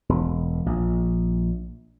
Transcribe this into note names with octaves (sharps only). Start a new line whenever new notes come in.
E1
A#1